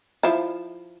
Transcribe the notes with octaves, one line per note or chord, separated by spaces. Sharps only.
F3 E4